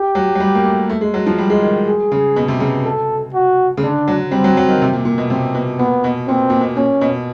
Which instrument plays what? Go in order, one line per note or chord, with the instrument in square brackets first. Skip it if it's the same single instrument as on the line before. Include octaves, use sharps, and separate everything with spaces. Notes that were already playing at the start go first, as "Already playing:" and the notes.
Already playing: [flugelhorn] G4
[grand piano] F#3
F#3
G3
A#3
A3
A3
G#3
F#3
F3
G3
G#3
D#3
[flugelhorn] G#4
[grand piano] C#3
B2
C3
C#3
[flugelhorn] A4
F#4
[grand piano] C#3
[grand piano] D3 [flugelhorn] D4
[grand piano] F#3
[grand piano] G3 [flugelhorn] C4
[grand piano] F#3
F#3
D#3
C3
A#2
A#2
B2
[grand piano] C3 [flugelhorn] C4
[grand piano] B2
[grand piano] A#2 [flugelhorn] B3
[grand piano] B2
[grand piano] A#2 [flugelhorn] C4
[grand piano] A#2
B2
[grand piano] A#2 [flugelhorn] C#4
[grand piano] B2